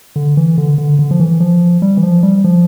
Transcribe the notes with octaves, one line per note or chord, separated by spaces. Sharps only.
D3
E3
D3
D3
D3
F3
E3
F3
G3
E3
F3
G3
F3